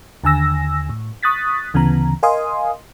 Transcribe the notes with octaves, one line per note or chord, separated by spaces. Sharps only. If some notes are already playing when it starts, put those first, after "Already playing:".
D#2 D3 G#5 E6 A#6
A2
C#6 D#6 F#6 A6 B6
D2 C#3 E3 B3 A#5
A#4 D#5 F5 G#5 C6 D#6